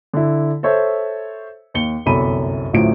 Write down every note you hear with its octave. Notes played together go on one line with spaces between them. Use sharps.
D3 E4
A4 C5 C#5 E5
D#2 C#7 G7
G1 C2 F#2 A4 B5 D#7
A1 D2 F3 F#3 E4 D7